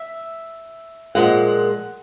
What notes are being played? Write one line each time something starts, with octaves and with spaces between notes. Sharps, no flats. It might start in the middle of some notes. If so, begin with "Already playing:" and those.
Already playing: E5
A#2 F3 G#3 F#5